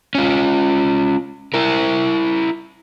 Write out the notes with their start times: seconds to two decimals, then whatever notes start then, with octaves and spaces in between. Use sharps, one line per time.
0.15 C#4 F4
1.54 E4 A#4